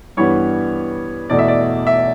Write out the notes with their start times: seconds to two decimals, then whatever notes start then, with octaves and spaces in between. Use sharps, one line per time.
0.17 G2 E3 G3 B3 C#5
1.30 E2 B2 A3 D5
1.39 E5
1.48 D5
1.87 E5